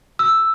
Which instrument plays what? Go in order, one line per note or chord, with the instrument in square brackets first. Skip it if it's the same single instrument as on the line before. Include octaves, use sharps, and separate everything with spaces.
[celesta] E6